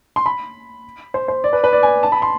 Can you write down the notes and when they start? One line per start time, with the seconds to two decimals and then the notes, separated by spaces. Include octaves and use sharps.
0.16 C6
0.26 B5
1.14 C5
1.28 C5
1.44 D5
1.53 B4
1.64 B4
1.73 D5
1.83 G#5
2.03 A5
2.12 B5
2.22 C6